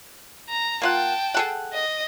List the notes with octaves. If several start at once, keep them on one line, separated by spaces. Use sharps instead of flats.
A#5
A#3 F4 F#5 G5 A5
G#4 A4 F#5
D#5